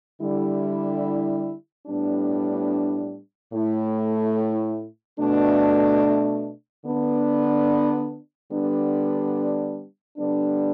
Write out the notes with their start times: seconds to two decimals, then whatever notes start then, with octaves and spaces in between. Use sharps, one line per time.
0.20 D3 G3 E4
1.87 A2 G3 B3 D4
3.53 A2 A3 E4
5.19 B2 A3 D4
6.85 D3 B3 D4
8.51 D3 G3 B3 D4
10.17 D3 G3 B3 D4